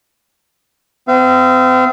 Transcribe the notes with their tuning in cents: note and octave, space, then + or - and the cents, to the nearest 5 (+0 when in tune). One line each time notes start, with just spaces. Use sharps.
C4 -40 F5 -40